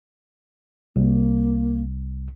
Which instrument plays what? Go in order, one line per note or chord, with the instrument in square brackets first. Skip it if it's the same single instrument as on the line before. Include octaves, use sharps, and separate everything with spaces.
[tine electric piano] C2 [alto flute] A#3